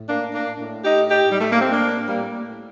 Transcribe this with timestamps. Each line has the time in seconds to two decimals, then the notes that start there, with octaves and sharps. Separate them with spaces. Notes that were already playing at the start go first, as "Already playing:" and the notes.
Already playing: A2
0.09 A#3 D4
0.34 A#3 D4
0.59 A2
0.84 D#4 G4
1.09 D#4 G4
1.31 A2 G3
1.41 A3
1.51 A#3
1.61 C4
1.71 A#3 D4
2.09 A2 G3 A#3